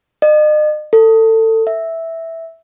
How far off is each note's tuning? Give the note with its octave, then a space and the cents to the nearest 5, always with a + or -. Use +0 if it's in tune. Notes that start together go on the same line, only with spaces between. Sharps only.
D#5 -40
A4 +25
E5 -5